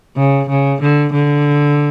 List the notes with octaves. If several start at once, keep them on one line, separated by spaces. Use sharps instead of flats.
C#3
C#3
D3
D3